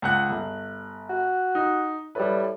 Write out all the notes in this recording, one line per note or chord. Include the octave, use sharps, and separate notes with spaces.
C#2 F#5 F#6
G1
F#4
D#4
A2 G3 B4